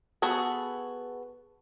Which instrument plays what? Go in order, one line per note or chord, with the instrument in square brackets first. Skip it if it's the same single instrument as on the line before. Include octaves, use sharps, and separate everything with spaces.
[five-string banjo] B3 F#4 G#4 A4